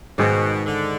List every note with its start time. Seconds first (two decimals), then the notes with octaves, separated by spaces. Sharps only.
0.18 G#2 B2 D#3 G#3
0.66 D3